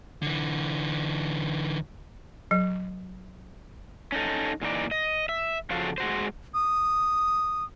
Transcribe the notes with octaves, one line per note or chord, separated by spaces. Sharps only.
D3 E3
F#3
C#4 D#4 A4
A#2 E3 D#4 D5
D#5
E5
C#3 F3 F4 F#4 A4 F5
G#3 F#4 C5
D#6